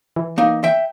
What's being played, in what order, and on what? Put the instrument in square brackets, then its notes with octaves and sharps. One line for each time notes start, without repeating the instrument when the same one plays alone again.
[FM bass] E3
[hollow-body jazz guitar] A#3 D#4
E5 G5